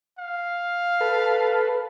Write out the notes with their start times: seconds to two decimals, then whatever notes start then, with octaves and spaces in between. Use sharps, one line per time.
0.18 F5
1.01 A4 B4